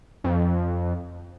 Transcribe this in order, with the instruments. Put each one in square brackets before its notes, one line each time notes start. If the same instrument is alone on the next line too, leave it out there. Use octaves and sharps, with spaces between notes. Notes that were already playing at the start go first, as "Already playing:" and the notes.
[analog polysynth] F2